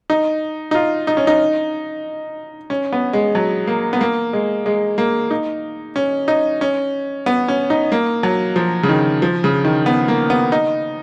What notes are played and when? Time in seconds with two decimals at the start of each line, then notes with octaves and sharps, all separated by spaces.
0.10 D#4
0.71 D#4
0.75 F4
1.07 D#4
1.17 C#4
1.27 D#4
2.70 C#4
2.92 B3
3.13 G#3
3.35 F#3
3.67 A#3
3.93 B3
4.01 A#3
4.33 G#3
4.66 G#3
4.98 A#3
5.30 D#4
5.96 C#4
6.28 D#4
6.61 C#4
7.26 B3
7.48 C#4
7.70 D#4
7.92 A#3
8.23 F#3
8.56 F3
8.83 C#3
8.89 D#3
9.22 F3
9.44 C#3
9.65 D#3
9.86 B3
10.08 A#3
10.30 B3
10.52 D#4